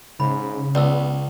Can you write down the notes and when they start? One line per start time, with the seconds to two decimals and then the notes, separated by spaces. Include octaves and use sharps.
0.20 G#2 C#3 B5
0.75 C#2 B3 D5 E6